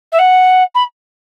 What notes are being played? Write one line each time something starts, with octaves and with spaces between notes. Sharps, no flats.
E5
F#5
B5